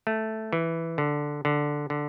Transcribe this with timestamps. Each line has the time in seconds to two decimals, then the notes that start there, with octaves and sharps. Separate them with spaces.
0.07 A3
0.53 E3
0.98 D3
1.45 D3
1.90 D3